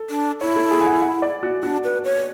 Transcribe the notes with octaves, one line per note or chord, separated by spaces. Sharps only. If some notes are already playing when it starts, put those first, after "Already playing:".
Already playing: A4
D4
E4 C#5
A4
G#4
G#5
F#5
F#5
D5
F#4
D4 F#4
B4
C#5